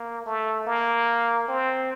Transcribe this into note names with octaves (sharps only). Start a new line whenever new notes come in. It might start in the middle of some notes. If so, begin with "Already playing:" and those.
Already playing: A#3
A3
A#3
C4